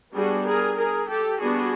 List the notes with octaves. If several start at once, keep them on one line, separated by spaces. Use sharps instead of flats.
G3 B3 D4 F#4 G#4
G#4 A#4
G#4 A#4
G4 A4
G3 B3 D4 F#4 G#4